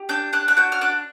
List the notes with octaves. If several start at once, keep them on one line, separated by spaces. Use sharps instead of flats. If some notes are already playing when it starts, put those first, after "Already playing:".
Already playing: G4
D4 G6
D4 F#6
F#6
F#4 G6
F6
D4 F#6